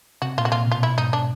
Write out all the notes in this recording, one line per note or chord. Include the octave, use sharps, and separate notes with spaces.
C3 F#4
A#2 F4
F#4
A#2 F4
B2 F4
B2 E4
G#2 D#4
D4